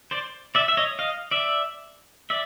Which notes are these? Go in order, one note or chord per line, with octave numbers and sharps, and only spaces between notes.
C5 D5
D5 E5
E5
C#5 D#5
D#5 F5
D5 E5
D5 E5